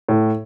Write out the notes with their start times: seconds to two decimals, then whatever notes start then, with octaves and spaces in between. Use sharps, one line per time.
0.09 A2